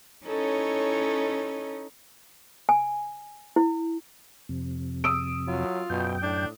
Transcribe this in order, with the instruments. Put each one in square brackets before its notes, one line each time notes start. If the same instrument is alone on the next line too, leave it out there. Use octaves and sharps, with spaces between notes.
[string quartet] C#4 D#4 E4 A4 C#5 D#5
[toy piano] G#5
E4
[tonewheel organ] F2 C3
[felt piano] D#6 E6 D7
[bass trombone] F#3 [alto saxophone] F4
[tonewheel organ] F#2 G5 [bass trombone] B2
[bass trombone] A2 [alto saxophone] D4